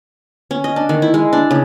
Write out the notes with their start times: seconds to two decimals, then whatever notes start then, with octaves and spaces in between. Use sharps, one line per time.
0.51 C#4
0.64 D#5
0.76 D4
0.89 D#3
1.02 E4
1.14 G#3
1.33 D4
1.51 C#3